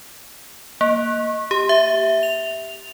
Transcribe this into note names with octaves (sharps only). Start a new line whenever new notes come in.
A#3
G4
E5
F7